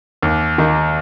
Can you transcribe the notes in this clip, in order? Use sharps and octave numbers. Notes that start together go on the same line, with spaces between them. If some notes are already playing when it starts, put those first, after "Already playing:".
D#2
D#3 A#3